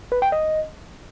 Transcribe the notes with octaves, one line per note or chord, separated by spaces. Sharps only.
B4
G5
D#5